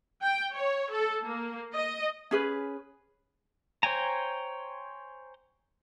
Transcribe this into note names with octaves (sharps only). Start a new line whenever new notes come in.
G5
C#5
A4
A#3
D#5
C#4 G#4 B4
C5 C#5 G5 G#5 A#5